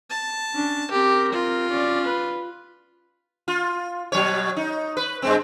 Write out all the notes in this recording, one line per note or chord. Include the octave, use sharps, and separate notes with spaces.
A5
C#4 D4
C4 G4 A#4
F4
C#4 D5
B4
F4
B2 F#3 C#5
D#4
B4
G2 G#3 C4